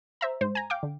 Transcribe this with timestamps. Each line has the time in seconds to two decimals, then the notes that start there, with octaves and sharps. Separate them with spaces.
0.21 C5 E5 A#5
0.41 G#2 C5
0.55 G#5 A#5
0.70 F5 G5 D6
0.83 D3